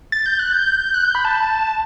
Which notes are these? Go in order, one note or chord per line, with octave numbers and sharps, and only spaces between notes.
A6
G6
F#6
G6
F#6
G6
B5
A5